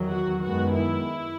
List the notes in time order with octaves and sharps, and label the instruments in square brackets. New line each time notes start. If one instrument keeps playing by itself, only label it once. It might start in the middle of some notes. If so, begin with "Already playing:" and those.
Already playing: [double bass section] E2 D#3 F#3
[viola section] F#4
[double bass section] F#2 D#3 G#3 B3 [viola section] F#4
[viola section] E4